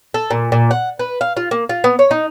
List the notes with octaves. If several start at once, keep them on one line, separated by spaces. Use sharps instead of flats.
A4
A#2
A#2
F#5
B4
F5
F4
A#3
F4
B3
C#5
D#4